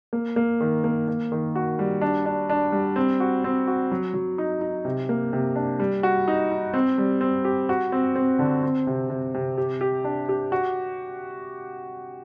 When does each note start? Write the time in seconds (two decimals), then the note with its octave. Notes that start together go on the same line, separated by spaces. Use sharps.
0.13 A#3
0.36 A#3
0.60 D#3
0.84 A#3
1.08 A#3
1.32 D#3
1.55 F#4
1.79 G3
2.01 D4
2.26 D4
2.50 D4
2.72 G3
2.96 C4
3.20 F#4
3.44 C4
3.67 F#4
3.91 F#3
4.14 F#3
4.38 D#4
4.61 D#4
4.85 C3
5.09 A#3
5.33 C3
5.56 D4
5.80 G3
6.03 F#4
6.28 D#4
6.51 D#4
6.74 C4
6.98 G3
7.21 C4
7.44 G4
7.69 F#4
7.92 C4
8.16 C4
8.39 D3
8.63 C4
8.87 C3
9.10 C3
9.34 C3
9.58 G4
9.81 G4
10.04 D4
10.29 G4
10.52 F#4